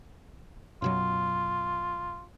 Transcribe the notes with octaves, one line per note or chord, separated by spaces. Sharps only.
F#2 B2 F#3 F4